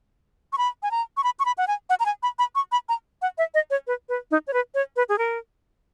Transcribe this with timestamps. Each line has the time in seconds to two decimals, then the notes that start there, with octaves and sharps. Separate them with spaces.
0.53 C#6
0.58 B5
0.83 G#5
0.91 A#5
1.17 C#6
1.24 B5
1.39 C#6
1.45 B5
1.58 F#5
1.68 G#5
1.90 F#5
2.00 A#5
2.06 G#5
2.23 B5
2.39 B5
2.55 C#6
2.72 B5
2.89 A#5
3.22 F#5
3.38 E5
3.54 D#5
3.70 C#5
3.87 B4
4.09 B4
4.31 D#4
4.47 C#5
4.53 B4
4.74 C#5
4.96 B4
5.09 G#4
5.18 A#4